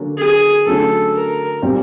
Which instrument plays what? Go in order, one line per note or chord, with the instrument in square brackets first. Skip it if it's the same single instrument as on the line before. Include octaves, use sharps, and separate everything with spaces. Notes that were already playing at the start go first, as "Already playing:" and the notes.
Already playing: [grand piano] D3 F#3 A#3 C#4
[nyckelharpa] G#4
[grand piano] D3 F#3 A3 C#4 F#4 [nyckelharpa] A4
[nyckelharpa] A#4
[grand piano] A#2 G3 C4